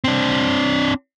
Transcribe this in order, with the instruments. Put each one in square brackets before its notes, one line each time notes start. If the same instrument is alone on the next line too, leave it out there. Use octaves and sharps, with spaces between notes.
[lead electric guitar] C4 D4